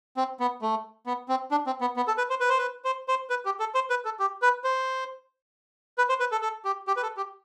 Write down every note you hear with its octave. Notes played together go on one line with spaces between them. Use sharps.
C4
B3
A3
B3
C4
D4
C4
B3
B3
A4
B4
C5
B4
C5
B4
C5
C5
B4
G4
A4
C5
B4
A4
G4
B4
C5
B4
C5
B4
A4
A4
G4
G4
B4
A4
G4